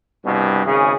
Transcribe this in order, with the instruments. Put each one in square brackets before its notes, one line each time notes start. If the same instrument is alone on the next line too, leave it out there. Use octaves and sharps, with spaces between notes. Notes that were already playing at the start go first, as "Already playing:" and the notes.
[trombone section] C2 G2 B2
G#1 C#3 G#4